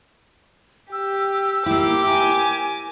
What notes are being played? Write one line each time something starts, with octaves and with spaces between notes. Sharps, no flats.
G4 E6
A#3 E4 G4 D6
A#4 G#5